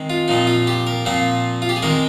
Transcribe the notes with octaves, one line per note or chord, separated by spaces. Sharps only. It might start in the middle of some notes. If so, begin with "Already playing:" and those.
Already playing: D#3 G#3 C4
F4
A#2 F3 C4 D#4
F4
G4
A#4
A#2 F3 C4 C5
F4
G4
G#4
D#3 G#3 C4 A#4